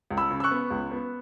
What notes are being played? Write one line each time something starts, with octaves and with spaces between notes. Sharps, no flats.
C#2
B5 E6
C#3
E6
C#6 F#6
B3
C#2
B3